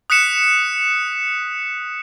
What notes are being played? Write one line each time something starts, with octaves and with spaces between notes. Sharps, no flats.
D#6 F#6 B6 C#7 E7